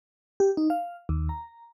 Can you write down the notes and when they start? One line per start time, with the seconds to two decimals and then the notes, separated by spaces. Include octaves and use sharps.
0.40 G4
0.57 D#4
0.70 F5
1.09 D#2
1.29 A#5